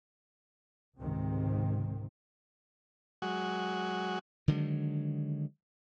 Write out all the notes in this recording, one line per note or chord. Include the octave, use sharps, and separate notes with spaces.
C#2 G#2 C3 D#3 C4
F#3 G#3 F#4
D3 D#3 F#3 G#3